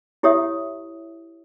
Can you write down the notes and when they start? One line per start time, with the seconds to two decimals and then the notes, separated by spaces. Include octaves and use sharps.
0.23 E4 G4 C#5 E5 D#6